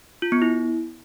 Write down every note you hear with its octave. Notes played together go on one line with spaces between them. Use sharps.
F4
B3
E4